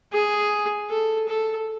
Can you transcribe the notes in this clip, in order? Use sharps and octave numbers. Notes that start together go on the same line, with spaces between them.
G#4
A4
A4